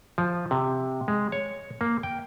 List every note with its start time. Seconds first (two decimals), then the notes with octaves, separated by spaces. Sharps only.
0.18 F3
0.51 C3
1.08 G#3
1.32 C#5
1.81 A#3
2.03 G5